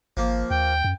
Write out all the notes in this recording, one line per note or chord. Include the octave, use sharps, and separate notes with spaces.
G#1 F3 A#3
D#2 G5
F#2